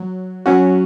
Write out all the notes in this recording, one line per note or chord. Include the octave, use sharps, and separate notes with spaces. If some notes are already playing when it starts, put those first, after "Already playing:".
Already playing: F#3
F#3 C#4 F#4